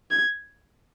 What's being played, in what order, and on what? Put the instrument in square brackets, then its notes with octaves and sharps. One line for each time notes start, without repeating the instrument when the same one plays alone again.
[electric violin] G#6